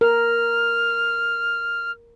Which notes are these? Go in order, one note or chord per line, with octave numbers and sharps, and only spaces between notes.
A#4 F6